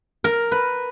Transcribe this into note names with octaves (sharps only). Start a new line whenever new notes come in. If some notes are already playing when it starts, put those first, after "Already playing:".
A#4
B4